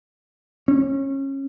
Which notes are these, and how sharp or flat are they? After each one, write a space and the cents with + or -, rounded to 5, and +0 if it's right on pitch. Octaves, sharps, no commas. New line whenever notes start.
C#4 -25